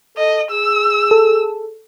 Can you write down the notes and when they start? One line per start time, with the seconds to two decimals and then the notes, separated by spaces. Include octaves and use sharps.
0.17 A4 D#5
0.51 G#4 E6
1.11 A4